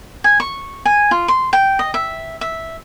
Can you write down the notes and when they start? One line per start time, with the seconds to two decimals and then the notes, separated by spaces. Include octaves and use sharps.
0.24 G#5
0.40 C#6
0.85 G#5
1.11 F4
1.28 C6
1.53 G5
1.79 D#5
1.94 E5
2.41 E5